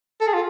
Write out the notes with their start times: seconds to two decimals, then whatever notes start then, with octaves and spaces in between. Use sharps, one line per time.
0.21 A4
0.27 G#4
0.34 F4